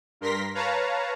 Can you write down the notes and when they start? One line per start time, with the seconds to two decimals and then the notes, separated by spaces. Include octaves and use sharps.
0.21 G2 A#4 C6 A#6 B6
0.55 B4 C#5 F5 A5 A#5